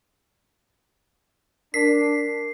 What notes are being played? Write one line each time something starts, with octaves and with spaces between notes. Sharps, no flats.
D4 A#4 B6 C7